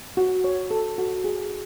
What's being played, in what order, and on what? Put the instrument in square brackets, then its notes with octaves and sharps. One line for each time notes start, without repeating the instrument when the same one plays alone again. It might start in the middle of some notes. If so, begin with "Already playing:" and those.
[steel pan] F#4
C#5
A4
F#4
G#4